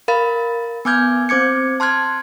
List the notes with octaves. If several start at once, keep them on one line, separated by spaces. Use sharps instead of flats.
A#4 F5 B5 A6
B3 G#5 D6 F6 G6 G#6
C4 C5 D6 G#6 C#7
A5 C6 F6 F#6 G#6